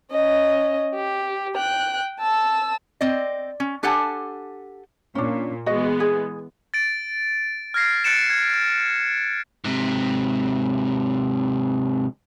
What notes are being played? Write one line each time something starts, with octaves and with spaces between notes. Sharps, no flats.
C#4 D#5
G4
G5 F#6
A5 E6
C4 C5 D5 D#5
C#4
D4 G4 A4 F#5 G#5 A5
A#2 C#4 D4
E3 G#3 B3 F#4 D#5
G#4
A6 D7
F6 G#6 A#6 C7
F#6 A6 C#7 D7 E7
G#6
G#2 C3